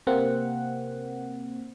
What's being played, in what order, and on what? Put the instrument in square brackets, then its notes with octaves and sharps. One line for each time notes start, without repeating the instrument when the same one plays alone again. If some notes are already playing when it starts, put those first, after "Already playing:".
[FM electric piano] C3 A#3 C4 F#5